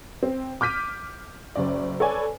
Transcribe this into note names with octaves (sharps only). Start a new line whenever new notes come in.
C4
D6 F6 G6 B6 D#7
F#1 C#4 D5
A4 B4 C#5 D5 G#5